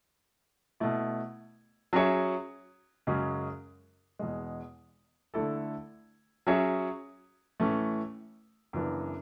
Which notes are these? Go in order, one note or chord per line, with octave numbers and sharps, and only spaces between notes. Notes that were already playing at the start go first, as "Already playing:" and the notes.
B2 A3 E4
F#3 C#4 G#4 C#5 E5
F#2 C#3 G#3 C#4 F#4
E2 B2 G#3
D3 A3 E4 A4
F#3 C#4 G#4 C#5 E5
A2 E3 A3 C#4
F#2 C#3 E3 B3 D4